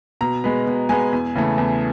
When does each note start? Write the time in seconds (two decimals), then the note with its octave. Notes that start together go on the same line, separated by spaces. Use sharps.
0.21 B2 A#5
0.44 G#3 B3
0.66 B2
0.89 G#3 B3 G#5
1.12 E2
1.35 C#3 E3 A3
1.58 E2